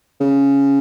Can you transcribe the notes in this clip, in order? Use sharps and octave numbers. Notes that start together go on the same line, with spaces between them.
C#3